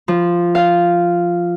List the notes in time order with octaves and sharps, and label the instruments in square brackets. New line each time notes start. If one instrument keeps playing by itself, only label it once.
[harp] F3
F5